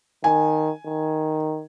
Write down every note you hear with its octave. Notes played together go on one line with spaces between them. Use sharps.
D#3 G#5
D#3